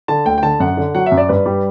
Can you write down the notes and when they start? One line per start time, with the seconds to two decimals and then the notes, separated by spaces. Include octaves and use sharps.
0.08 D3 A5
0.25 D2 G5
0.38 G5
0.43 D3 A5
0.60 F#2 F#5
0.77 D3
0.94 F#3 F#5
1.06 E5
1.12 F#2
1.17 D5
1.29 G2 B4
1.46 G3